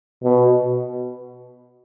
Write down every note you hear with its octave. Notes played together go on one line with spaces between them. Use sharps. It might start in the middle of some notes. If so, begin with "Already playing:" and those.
B2